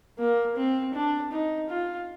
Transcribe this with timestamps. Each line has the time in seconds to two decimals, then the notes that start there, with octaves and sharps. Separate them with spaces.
0.19 A#3
0.56 C4
0.94 D4
1.32 D#4
1.69 F4